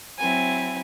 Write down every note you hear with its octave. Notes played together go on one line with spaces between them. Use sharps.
F#3 C4 E4 G#5